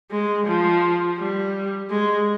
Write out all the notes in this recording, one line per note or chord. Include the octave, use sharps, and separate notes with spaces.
G#3
F3
G3
G#3